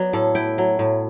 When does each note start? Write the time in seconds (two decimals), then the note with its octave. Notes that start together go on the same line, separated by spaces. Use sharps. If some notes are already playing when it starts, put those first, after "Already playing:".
Already playing: F#3 B3 D5
0.13 A2 A4
0.35 E4 G5
0.58 F#3
0.79 A2